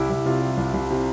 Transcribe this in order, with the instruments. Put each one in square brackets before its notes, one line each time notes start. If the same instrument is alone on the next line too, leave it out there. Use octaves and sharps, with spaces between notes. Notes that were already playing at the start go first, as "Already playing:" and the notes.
Already playing: [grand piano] C2 G3 E4 G4
C2 E4
C3 F4
G3
C2
C2
C3